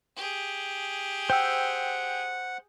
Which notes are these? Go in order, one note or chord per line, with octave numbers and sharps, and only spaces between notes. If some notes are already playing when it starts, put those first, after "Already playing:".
G4 G#4
C5 F#5 G5 E6